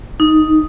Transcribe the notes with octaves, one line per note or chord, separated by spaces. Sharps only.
D#4